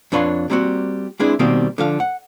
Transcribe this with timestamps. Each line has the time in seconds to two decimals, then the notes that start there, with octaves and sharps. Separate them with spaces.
0.12 F2 D4 B4 C#5 F5 C6
0.50 G3 A#3 C4 F4 F#4
1.20 G#3 C4 D4 E4 G#4 B4
1.39 B2 D#3 G3 A#3 C4 G4
1.78 D3 F3 F5
2.00 F#5